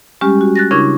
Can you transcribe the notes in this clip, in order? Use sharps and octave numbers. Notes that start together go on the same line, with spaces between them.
G3 G#3 C#4 G4 F6
F#4
F#6 A6 A#6
C#3 D4 E4 A#4 C#6 G#6